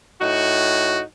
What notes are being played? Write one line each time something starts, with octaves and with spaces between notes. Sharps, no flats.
A2 D#4 F#4